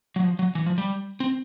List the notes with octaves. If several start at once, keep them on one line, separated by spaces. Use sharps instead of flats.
F#3
F3
F#3
E3
F3
G3
C4